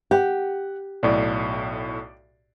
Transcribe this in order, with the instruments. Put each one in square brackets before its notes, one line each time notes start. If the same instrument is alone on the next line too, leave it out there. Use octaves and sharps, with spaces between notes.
[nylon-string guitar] G4 [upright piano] F#5
[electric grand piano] B1 A2 [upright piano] D5